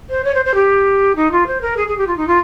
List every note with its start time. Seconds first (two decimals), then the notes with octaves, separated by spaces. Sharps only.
0.10 C5
0.24 C#5
0.34 C5
0.45 C5
0.54 G4
1.16 D#4
1.32 F4
1.47 C5
1.61 A#4
1.77 G#4
1.88 G#4
1.97 G4
2.07 F4
2.17 D#4
2.27 F4